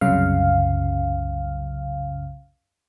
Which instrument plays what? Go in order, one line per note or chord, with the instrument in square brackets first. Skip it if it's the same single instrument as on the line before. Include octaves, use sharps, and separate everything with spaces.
[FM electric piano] C2 F#2 C#3 F5